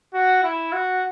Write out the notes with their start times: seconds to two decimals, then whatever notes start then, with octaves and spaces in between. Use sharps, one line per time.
0.14 F#4
0.43 E4
0.72 F#4